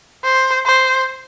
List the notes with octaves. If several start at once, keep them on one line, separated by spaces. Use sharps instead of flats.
C5
C5